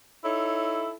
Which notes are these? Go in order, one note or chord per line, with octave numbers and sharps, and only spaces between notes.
D#4 E4 A4 C#5